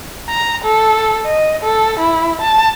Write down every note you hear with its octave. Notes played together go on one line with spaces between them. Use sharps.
A#5
A4
D#5
A4
E4
A5